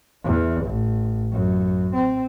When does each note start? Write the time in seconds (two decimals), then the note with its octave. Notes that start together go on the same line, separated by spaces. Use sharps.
0.25 E2
0.65 A1
1.33 F#2
1.94 C4